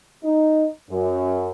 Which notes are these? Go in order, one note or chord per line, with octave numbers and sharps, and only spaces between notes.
D#4
F#2